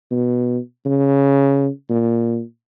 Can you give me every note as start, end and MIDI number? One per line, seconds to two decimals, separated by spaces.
0.11 0.58 47
0.86 1.69 49
1.90 2.42 46